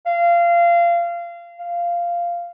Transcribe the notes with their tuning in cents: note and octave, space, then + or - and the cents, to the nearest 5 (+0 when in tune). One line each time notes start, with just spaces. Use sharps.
F5 -25
F5 -10